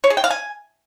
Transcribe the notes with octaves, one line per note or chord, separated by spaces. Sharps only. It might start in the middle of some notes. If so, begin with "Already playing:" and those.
C#5
G#4
G5
F5
G#5